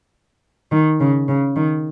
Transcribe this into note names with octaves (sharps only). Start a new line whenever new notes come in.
D#3
C#3
C#3
D#3